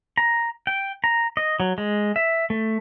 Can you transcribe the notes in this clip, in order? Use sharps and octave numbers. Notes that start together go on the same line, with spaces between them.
A#5
G5
A#5
D#5
F#3
G#3
E5
A3